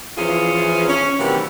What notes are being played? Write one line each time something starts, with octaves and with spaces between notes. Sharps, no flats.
E2 E3 F3 C#4 F4 G#4
C#4
C3 D#3 E3 G3 A#3 F#4